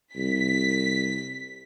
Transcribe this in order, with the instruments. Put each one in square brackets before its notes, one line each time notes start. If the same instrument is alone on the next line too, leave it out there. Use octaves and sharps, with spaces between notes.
[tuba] C2 [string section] B6